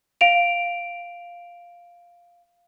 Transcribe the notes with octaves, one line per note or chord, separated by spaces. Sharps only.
F5 D7 F7